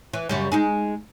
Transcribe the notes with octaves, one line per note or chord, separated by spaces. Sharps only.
E3
F#2 C#3 G3
G#3 D#4 G#4